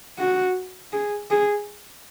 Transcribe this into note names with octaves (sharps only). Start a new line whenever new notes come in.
F#4
G#4
G#4